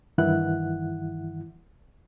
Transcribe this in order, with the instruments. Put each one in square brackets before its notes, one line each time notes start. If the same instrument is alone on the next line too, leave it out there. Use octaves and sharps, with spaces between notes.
[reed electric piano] G2 D#3 E3 E4 F#5 F#6